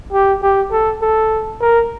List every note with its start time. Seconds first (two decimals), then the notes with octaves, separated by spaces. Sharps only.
0.13 G4
0.42 G4
0.72 A4
1.02 A4
1.61 A#4